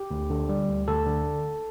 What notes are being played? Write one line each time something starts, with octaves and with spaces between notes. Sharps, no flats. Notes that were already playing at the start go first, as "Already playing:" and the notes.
Already playing: G4
D2
D3
G3
D2
D2 A4
D3